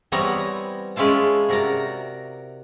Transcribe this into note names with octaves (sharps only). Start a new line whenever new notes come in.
E3 G3 B3 C4 C#5 A#5
G#3 C#4 E4 F4 A5
C3 F#4 A#4 D5 A#5